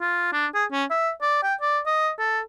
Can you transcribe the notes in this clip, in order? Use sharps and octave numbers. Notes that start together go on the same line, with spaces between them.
F4
D4
G#4
C#4
E5
D5
G5
D5
D#5
A4